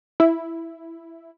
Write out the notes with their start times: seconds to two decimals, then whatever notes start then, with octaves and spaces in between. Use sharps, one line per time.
0.20 E4